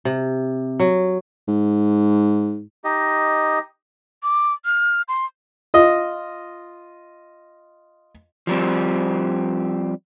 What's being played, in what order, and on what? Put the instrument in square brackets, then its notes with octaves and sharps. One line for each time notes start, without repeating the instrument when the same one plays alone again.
[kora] C3
F#3
[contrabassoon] G#2
[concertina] D#4 G4 D#5
[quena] D6
F6
C6
[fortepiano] F4 D#5
[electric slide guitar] F3 G3 C4